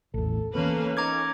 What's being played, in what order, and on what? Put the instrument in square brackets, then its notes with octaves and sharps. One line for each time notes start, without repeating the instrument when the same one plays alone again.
[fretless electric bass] A1 E2 [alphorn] A4
[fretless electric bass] E3 B3 [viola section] A#3 C#4 B4 [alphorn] A4
[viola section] C#4 [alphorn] D#4 [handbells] A#5 D6 G#6